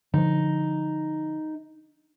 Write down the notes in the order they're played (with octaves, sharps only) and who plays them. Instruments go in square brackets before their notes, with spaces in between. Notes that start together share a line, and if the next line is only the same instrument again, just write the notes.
[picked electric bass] D3 F3 [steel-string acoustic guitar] D#4